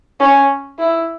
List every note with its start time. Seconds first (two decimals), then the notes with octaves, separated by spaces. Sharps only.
0.20 C#4
0.79 E4